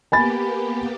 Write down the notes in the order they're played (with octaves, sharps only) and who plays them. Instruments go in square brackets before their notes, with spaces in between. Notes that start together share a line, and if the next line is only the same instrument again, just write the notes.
[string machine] A#3 B3 G4 [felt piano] G#5 B5 A6